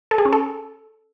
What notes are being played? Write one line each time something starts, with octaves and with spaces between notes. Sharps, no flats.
A4
G#4
C#4
A4